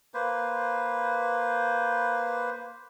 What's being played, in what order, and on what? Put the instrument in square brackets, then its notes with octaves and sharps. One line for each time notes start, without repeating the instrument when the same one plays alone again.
[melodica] A#3 B4 C5